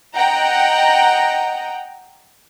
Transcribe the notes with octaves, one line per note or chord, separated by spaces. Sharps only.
D#5 F#5 G5 A#5